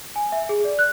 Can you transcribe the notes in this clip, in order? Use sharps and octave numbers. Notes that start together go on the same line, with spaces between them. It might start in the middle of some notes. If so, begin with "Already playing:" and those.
G#5
E5
G#4
D5
F#6